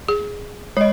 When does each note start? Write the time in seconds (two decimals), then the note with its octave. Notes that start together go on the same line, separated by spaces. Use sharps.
0.09 G#4
0.77 G#3 C#5 D#5